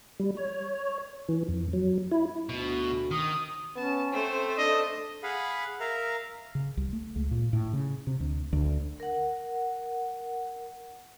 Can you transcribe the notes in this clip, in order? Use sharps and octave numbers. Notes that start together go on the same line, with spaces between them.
G3
C#5
E3
F2
F#3
E4
D2 B2
D#3 D#6
B3 C#4 A5
A3 C4 C5
D4 A4 D#5
G#4 F5 F#5 B5
A#4 E5 F5 A#5
C#3
C2
A3
C#2
A#2
A2
C#3
C3
D2
D2
A#4 F#5